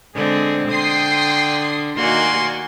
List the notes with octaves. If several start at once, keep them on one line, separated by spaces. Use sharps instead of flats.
D3 G#3 C4 G#4
D3 G5 C6 D#6 C7
D#3 A#3 F#4 D5 G#5 C6 C#6